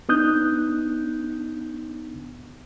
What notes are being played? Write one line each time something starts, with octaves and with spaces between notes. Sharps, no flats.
B3 D4 D#4 D#6 F#6 G6